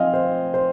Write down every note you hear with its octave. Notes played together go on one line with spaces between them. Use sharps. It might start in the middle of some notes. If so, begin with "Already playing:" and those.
Already playing: F3 C4 D#4 D#5 F5 G#5
C5
C5